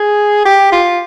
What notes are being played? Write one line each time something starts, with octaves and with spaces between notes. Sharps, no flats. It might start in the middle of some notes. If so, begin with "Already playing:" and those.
Already playing: G#4
G4
F4